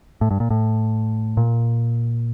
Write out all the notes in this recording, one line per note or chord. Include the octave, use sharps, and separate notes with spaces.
A2
G2
A#2
A2
A#2